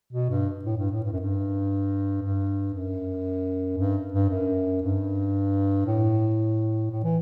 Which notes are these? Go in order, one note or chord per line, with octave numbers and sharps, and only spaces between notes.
B2
G2
A2
G2
A2
G2
F#2
G2
G2
F#2
G2
G2
F#2
G2
A2
A2
E3